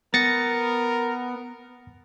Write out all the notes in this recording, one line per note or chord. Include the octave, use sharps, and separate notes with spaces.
B3 A#4 A6 A#6 C#7